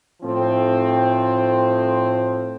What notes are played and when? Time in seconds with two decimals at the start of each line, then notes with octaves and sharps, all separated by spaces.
0.22 A2 F3 C4